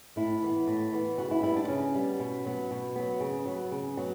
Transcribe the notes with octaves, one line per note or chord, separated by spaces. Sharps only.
A2 E4
E3 B3
A2
E3 B3
C#3 F#4
E4
G3 B3 E4
D4
C#3 C#4
G3 B3
B2
F#3 B3
B2
F#3 B3
C#3
F#3 B3
C#3
F#3 B3